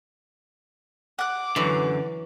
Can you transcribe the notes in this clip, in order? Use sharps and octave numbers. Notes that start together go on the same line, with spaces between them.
F#5 D6 F#6
F#2 D3 E3 F#3 D5